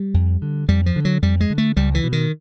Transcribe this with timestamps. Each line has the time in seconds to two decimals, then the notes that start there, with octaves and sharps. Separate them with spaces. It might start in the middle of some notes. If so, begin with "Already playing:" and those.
Already playing: G3
0.14 F2
0.42 D3
0.68 F2 G3
0.86 F3
0.96 D3
1.05 F#3
1.22 F2 G3
1.40 G#3
1.50 D3
1.58 A3
1.76 C#2 G3
1.95 E3
2.04 B2
2.13 D#3